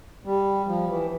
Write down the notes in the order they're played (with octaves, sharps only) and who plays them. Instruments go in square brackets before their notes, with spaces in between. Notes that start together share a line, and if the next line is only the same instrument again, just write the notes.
[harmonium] G3
F3
E3